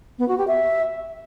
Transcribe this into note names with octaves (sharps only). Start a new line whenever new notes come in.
B3
F#4
G4
E5